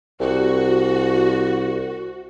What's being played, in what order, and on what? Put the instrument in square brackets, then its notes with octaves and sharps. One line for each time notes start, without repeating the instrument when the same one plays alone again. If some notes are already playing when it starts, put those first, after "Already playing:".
[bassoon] C2 [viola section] F#4